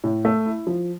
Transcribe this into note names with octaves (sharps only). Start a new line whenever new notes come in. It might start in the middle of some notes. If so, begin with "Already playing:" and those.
A2
A3
E4
F3